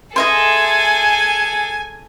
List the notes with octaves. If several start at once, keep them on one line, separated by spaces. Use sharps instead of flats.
G#4 A4 D#5 E5 G#5 C6